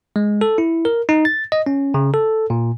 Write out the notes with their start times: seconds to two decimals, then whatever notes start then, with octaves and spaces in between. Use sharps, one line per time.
0.16 G#3
0.41 A4
0.58 E4
0.85 A#4
1.09 D#4
1.25 A6
1.52 D#5
1.66 C#4
1.94 C#3
2.14 A4
2.50 A#2